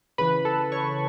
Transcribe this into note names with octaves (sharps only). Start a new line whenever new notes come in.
C#3 E3 B4 B5
A4 A5
C#5 C#6